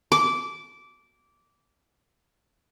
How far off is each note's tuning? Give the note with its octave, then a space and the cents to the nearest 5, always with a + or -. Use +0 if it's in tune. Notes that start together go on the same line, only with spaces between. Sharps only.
D6 -15